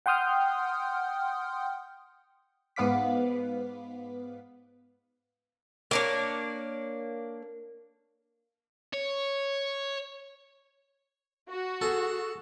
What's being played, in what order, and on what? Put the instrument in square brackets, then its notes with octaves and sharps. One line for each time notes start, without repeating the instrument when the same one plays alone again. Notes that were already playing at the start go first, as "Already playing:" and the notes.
[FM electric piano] F#5 G5 C6 D#6 F6 G6
[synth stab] G#2 B3 B4 F5 D6 B6
[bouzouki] A#3 D4 C#5
[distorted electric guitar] C#5
[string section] F#4
[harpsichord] G#4 A4